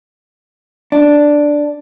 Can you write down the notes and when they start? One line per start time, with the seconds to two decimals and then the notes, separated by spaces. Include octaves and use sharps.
0.92 D4